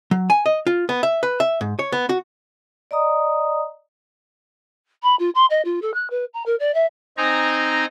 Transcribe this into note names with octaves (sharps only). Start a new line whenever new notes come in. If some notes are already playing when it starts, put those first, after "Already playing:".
F#3
G#5
D#5
F4
B3
E5
B4
E5
G#2
C#5
B3
F#4
D5 D#5 A#5 D#6
B5
F4
C6
D#5
F4
A4
F#6
B4
A#5
A#4
D5
E5
C4 D#4 D#5 G#5 A#5